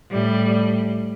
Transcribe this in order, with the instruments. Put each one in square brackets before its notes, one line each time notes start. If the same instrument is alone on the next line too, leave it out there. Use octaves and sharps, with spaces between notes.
[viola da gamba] A2 G3